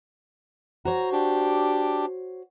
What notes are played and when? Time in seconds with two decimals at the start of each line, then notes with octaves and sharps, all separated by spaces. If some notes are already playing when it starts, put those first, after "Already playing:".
0.85 F#4 C5 C#5 A#5
1.13 D4 G4